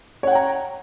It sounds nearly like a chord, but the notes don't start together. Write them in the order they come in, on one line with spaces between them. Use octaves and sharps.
C#5 F#5 G5 A#5